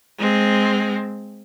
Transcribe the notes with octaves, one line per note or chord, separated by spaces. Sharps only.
G#3 C4